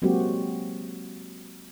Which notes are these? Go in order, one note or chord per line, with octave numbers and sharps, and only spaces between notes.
F#3 G#3 A#3 C4 F#4 G4